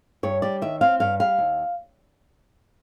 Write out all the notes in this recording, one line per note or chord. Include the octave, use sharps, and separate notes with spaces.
G2 C#5
G3 D5
D#3 E5
C4 F5
G2 F5
G3 F5
D#2